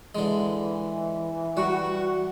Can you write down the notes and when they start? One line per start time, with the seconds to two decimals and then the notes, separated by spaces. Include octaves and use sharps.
0.15 D3 E3 G#3
1.57 G3 F#4